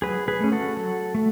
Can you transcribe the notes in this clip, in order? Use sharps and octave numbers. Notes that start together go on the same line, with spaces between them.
F#3 G#4 B4
G#4 B4
A3 C#4
F#4 A4
F#3
A3